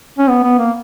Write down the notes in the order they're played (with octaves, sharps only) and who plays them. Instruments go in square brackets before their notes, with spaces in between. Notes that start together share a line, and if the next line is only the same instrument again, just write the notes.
[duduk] C#4
B3
B3
A#3